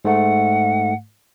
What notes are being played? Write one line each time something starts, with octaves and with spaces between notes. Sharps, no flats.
G#2 A3 F#5